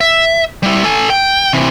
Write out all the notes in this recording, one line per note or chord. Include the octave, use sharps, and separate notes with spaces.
E5
G3 E4
A4 G#5
G5
C3 E3